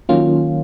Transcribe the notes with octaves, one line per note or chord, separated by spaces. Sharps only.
D#3 F#3 A#3 C#4 F4